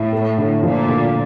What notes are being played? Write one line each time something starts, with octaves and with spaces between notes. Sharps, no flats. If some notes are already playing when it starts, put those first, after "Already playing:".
Already playing: A2 E4
A3
D3
A#2 F3
D3